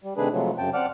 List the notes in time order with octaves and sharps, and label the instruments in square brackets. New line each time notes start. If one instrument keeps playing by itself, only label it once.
[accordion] G3
C3 D#3 A3 D4 G#4 B4
C3 F3 F#3 G#3 A3
F#2 C#3 G5 A5
C4 D5 F#5 A5 D6 F6